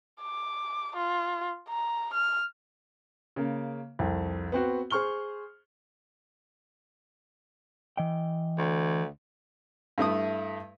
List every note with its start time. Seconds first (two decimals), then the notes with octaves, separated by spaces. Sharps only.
0.21 D6
0.96 F4
1.69 A#5
2.14 F6
3.36 C#3 A#3
3.99 C2 F2
4.52 B3 C4 F#4
4.90 G#4 C5 C#6 F6 G7
7.97 E3 D#5 G5
8.58 D2
9.98 G2 A3 E4 D#6